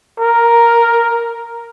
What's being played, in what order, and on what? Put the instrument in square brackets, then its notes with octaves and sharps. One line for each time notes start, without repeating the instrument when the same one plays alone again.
[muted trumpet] A#4